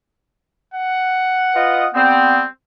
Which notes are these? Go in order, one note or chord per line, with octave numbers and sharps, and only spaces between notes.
F#5
F4 B4 D#5
G3 B3 C4